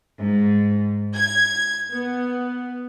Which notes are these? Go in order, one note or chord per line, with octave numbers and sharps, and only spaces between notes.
G#2
G#6
B3